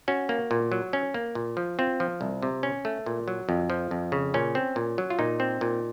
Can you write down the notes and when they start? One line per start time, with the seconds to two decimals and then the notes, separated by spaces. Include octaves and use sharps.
0.08 C#4 F#4
0.29 A#3
0.51 A#2
0.72 F#3
0.93 C#4
1.14 A#3
1.35 A#2
1.57 F3
1.79 C4 F4
2.00 F3
2.21 C2
2.43 C3
2.63 C#4
2.85 A3
3.06 A#2
3.28 F#3
3.49 F2
3.70 F3
3.91 F2
4.12 C#3
4.34 A#2 C#4
4.55 C4
4.76 A#2
4.98 F#3
5.10 F4
5.19 A#2 D#4
5.40 C4
5.61 A#2